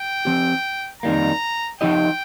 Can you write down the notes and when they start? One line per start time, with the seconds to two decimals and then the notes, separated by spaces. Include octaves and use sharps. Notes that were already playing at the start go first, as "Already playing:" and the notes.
Already playing: G5
0.25 F3 C4 G4
1.03 F2 D#3 G3 A#3 A#5
1.80 F3 D#4 G4 D#5 G5